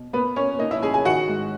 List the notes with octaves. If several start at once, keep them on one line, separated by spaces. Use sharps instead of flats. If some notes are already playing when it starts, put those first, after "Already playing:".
Already playing: B2
A#3 B3 B4
A#3 C#4 C#5
A#3 D#4 D#5
E4 E5
C#4 G#4 G#5
G#4 G#5
D#3 F#4 F#5
G#2